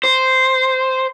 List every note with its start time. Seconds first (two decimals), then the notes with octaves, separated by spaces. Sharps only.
0.04 C5